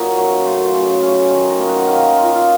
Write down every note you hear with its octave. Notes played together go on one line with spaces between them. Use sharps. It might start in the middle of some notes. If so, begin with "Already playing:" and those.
Already playing: A#2 F#3 A#3 D#4
F#2 C#6
C#3 A3 C6
C#6
C#3 C6
A3 C#4
D#3 C#6
A#5
A#3 D#4
F#5
D#3 D#5 F5
A#3 F4
F5